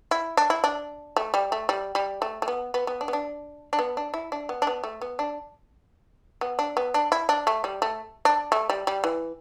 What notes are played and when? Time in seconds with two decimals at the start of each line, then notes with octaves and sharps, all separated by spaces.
0.11 E4
0.37 D4
0.50 E4
0.64 D4
1.16 A3
1.34 G3
1.52 A3
1.69 G3
1.95 G3
2.22 A3
2.42 A3
2.48 B3
2.74 B3
2.87 B3
3.01 D4
3.08 B3
3.13 D4
3.73 D4
3.79 B3
3.97 D4
4.14 E4
4.32 D4
4.49 B3
4.62 D4
4.67 B3
4.83 A3
5.01 B3
5.19 D4
6.41 B3
6.59 D4
6.77 B3
6.94 D4
7.12 E4
7.29 D4
7.47 A3
7.64 G3
7.82 A3
8.25 D4
8.52 A3
8.69 G3
8.87 G3
9.04 E3